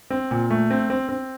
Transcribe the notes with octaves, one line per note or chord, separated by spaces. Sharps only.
C4
A#2
A3
C4
C4
C4